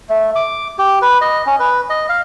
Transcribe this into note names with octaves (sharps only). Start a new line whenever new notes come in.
A3
D6
G4
B4
D#5
C#4
B4
D#5
F5